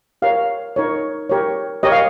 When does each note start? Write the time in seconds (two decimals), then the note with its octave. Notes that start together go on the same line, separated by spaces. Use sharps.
0.22 G4 A#4 C#5 F5
0.76 D#4 A#4 C#5
1.29 G4 A#4 C#5
1.83 G4 A#4 C#5 D#5
1.92 F5